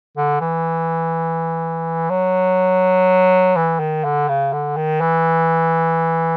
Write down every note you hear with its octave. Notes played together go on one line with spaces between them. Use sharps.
D3
E3
F#3
E3
D#3
D3
C#3
D3
D#3
E3